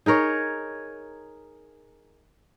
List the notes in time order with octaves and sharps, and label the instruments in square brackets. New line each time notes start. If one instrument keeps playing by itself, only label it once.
[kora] D#4 G#4 A#4 C#5